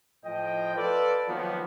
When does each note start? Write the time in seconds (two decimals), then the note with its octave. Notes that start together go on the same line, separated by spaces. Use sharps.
0.25 A2 F3 D#5 G5
0.76 F4 A4 B4 D5
1.28 D#3 F3 F#3 A#3 B3